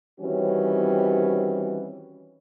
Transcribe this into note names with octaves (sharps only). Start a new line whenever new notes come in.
D#3 E3 G3 C4 C#4 F#4